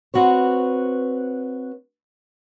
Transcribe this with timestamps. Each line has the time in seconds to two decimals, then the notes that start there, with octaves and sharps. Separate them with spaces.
0.14 C4 F#4 B4 C#5